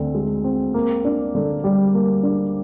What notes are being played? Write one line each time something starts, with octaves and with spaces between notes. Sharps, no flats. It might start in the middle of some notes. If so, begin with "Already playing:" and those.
Already playing: D2 D3 C4
G#3
C4
A#3
D4
D3
G3
A#3
D4